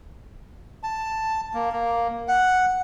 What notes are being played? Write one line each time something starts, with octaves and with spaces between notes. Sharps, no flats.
A5
A#3
A#3
F#5